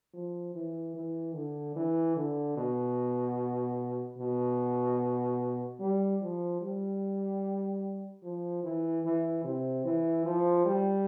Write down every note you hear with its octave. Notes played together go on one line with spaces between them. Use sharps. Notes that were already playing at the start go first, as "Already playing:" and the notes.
F3
E3
E3
D3
E3
D3
B2
B2
G3
F3
G3
F3
E3
E3
C3
E3
F3
G3